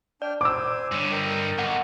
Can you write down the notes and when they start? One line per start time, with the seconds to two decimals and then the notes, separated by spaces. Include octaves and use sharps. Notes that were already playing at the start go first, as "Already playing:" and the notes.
0.22 D4 D5 G5 F6
0.41 C5 G#5 D6 E6
0.92 G2 D3 C#5
1.11 A#4 D#5 G5
1.58 B1 F#5